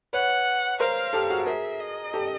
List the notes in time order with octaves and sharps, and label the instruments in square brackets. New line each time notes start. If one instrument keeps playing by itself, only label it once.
[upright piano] B4 C#5 [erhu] F#5
[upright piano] A#4 C5 [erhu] F5
[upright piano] G4 A4
F#4 G#4
[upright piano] G#4 A#4 [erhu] E5
[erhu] D#5
[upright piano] G4 A4